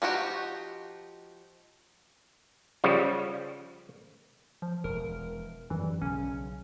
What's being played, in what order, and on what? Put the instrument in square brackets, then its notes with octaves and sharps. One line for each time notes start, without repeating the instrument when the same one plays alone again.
[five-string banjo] F3 D#4 F#4 G4
[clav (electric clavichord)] C#3 F3 G3
[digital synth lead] F3
[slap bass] E1 [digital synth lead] A#4
[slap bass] F#2 D#3 G3 [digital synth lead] E3
[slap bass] B1 C#3 [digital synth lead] C#4